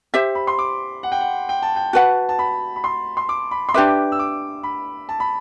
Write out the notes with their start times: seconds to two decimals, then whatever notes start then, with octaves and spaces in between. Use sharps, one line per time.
0.14 G4 C5 E5
0.35 B5
0.47 C6
0.59 D6
1.03 F#5
1.12 G5
1.21 F#5
1.49 G5
1.63 A5
1.76 G5
1.93 F#4 B4 F#5 A5
2.29 A5
2.39 B5
2.76 B5
2.84 C6
3.17 C6
3.29 D6
3.51 B5
3.69 C6
3.74 D4 G4 B4 E5 D6
4.12 E6
4.19 D6
4.63 B5
5.09 A5
5.20 B5